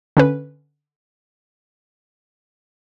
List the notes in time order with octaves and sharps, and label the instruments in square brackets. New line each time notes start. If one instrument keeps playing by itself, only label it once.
[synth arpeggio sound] D3 C#4 B4